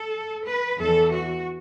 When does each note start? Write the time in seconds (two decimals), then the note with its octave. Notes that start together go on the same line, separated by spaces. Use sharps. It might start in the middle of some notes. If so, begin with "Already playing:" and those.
Already playing: A4
0.47 B4
0.79 E2 E3 A4
1.13 F#4